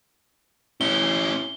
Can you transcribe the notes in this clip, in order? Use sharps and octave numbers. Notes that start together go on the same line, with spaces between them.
C#4 E4 G7